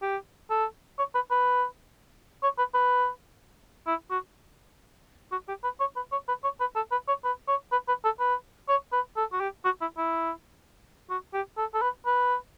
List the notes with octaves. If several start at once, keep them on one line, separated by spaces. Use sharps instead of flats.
G4
A4
C#5
B4
B4
C#5
B4
B4
E4
F#4
F#4
G4
B4
C#5
B4
C#5
B4
C#5
B4
A4
B4
C#5
B4
C#5
B4
B4
A4
B4
C#5
B4
A4
F#4
G4
F#4
E4
E4
F#4
G4
A4
A4
B4
B4